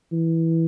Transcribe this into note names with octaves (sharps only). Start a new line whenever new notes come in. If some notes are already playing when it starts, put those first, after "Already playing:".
E3